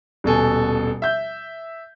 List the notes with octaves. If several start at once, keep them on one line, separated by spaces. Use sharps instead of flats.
D#1 B2 A4 G#5
E5 G6